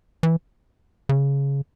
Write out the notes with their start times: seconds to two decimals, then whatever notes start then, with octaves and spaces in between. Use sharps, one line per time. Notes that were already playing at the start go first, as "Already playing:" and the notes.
0.23 E3
1.09 C#3